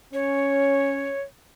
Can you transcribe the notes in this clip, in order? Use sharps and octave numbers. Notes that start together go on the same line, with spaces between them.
C#4 C#5